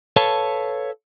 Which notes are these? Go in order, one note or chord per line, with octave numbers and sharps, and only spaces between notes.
A4 B4 C#5 F5 A5